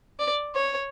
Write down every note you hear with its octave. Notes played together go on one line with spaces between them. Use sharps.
D5
C#5